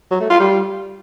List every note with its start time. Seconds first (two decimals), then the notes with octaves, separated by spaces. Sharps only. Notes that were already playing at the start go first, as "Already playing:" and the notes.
0.11 F#3
0.20 A3
0.30 F4
0.40 G3